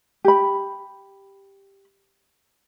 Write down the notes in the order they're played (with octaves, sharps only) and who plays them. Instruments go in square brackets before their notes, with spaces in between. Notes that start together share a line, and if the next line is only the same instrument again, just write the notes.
[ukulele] G4 B5